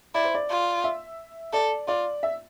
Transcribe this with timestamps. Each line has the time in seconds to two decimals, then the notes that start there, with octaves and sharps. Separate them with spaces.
0.15 E4 D5
0.24 C5
0.34 D5
0.50 F4
0.84 E5
1.53 A4 D5
1.88 F4 D5
2.23 E5